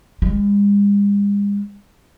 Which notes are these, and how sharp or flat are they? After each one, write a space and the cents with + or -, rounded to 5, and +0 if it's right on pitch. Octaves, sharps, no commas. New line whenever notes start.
G#3 -45